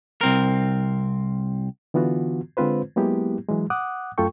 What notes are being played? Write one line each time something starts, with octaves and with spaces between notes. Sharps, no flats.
C2 C4 A#4
D3 E3 B3 F4 F#4
D3 G#3 C4 F4 B4 C5
F#3 G#3 A#3 B3 E4 G4
E3 F#3 G#3
F#5 D6 D#6 F#6
F#2 A3 F4 A4 G5 C#6